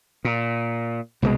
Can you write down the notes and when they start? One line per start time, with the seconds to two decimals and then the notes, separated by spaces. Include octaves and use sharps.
0.25 A#2
1.22 C2 B2 D3 G#3